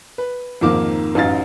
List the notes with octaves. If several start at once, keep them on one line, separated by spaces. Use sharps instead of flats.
B4
F2 G#2 D#3 A#3 D6
A1 F#2 D#4 F5 A6